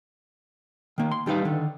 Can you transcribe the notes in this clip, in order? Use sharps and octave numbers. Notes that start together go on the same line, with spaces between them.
D#3 A#3
C6
D#2 G3 D#4 B4 F5
D3 D#3